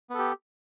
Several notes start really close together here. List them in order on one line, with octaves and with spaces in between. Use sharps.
B3 A4 G4